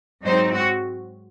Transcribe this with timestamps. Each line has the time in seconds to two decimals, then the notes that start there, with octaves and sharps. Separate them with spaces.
0.23 G#2 F#3 C4 D#4 C5
0.53 F#4